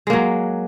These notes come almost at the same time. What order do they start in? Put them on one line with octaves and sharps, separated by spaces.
G#3 A#3 F#3